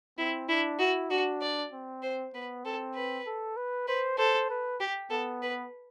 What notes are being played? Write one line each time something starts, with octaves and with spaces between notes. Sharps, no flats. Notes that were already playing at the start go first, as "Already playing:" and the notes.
C4 E4
D4 E4
E4 F#4
D4 F#4
D5
C4
C5
B3 B4
C4 A4
B4
A4
B4
B4 C5
A4 C5
B4
G4
B3 A4
B4